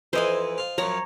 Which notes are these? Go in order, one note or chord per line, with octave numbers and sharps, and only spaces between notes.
F2 E3 C5 D#5 G#5
F4
F#2 F3 C#5 A#5